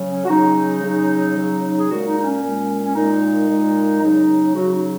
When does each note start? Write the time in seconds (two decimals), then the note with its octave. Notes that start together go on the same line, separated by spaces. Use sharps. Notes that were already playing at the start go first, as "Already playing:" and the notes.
Already playing: C#3 F#3
0.12 C#4
0.25 F#4
0.30 C#3 F#3 D#4
0.82 C#3 F#3
1.36 C#3 F#3
1.78 G#4
1.89 A#2 G#3 F#4
2.07 D#4
2.18 D#4
2.24 C#4
2.42 A#2 G#3
2.86 C#4
2.95 A#2 G#3 D#4
3.49 A#2 G#3
4.02 C#3 F#3 D#4
4.54 C#3 F#3 F#4
4.73 D#4